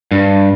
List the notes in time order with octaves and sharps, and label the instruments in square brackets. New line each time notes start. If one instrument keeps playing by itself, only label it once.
[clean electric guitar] G2